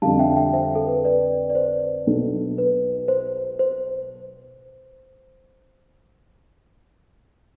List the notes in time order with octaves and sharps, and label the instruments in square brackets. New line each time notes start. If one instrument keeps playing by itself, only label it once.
[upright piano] F2 D3 G3 [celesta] F5 A5
[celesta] E5 G5
E5 G5
C5 E5
A4
B4
B4 D5
D5
C5
[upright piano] B1 B2 B3 D4 A4
[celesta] B4
C5
C5